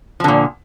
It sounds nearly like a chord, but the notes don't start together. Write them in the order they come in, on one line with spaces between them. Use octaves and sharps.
F3 D3 A#2